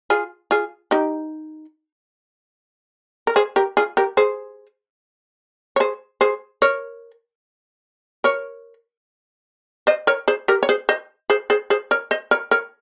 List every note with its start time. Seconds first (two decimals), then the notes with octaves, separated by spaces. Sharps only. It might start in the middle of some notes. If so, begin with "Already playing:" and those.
0.10 F4 G#4
0.51 F4 G#4
0.91 D#4 G4
3.27 A#4
3.36 G#4 C5
3.56 G4 A#4
3.77 F4 G#4
3.97 G4 A#4
4.17 G#4 C5
5.76 C#5
5.80 G#4 C5
6.21 G#4 C5
6.62 A#4 C#5
8.24 A#4 C#5
9.87 C5 D#5
10.07 A#4 C#5
10.28 G#4 C5
10.48 G4 A#4
10.63 C#5
10.69 G#4 C5
10.89 C5 D#5
11.30 G#4 C5
11.50 G#4 C5
11.70 G#4 C5
11.91 A#4 C#5
12.11 C5 D#5
12.31 A#4 C#5
12.51 A#4 C#5